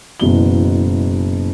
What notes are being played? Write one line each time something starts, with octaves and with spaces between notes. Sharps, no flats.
F#1 B2 E3 G7